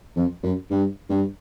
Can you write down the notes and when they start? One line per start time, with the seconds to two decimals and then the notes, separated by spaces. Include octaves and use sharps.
0.16 F2
0.43 F#2
0.71 G2
1.09 G2